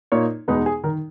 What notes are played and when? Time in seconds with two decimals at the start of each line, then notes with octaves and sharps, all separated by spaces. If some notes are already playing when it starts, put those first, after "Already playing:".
0.12 A#2 A#3 D#4 C#5
0.48 E2 B2 G#3 B3 D#4 B4
0.66 G#4
0.84 D#3 A#4